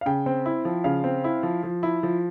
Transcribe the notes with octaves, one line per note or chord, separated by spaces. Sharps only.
F5
C#3 G5
C4
E4
F3
C#3 F5
C4
E4
F3
F3
E4
F3